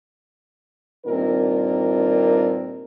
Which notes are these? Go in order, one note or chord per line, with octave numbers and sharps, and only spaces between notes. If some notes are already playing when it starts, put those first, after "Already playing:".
G2 A#2 D#3 C4 A#4